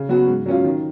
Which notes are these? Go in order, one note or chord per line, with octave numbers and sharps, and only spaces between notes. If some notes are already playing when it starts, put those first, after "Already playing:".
Already playing: C#3
F#3 B3 F#4
G#2
F#3 C#4 F4
D#3